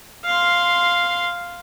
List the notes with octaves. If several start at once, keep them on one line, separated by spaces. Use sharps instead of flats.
F5 C6